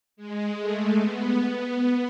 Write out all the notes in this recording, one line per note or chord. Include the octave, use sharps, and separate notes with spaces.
G#3
A3
B3
B3